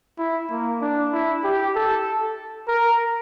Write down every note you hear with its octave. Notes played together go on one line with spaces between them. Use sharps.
E4
A#3
D4
E4
G4
A4
A#4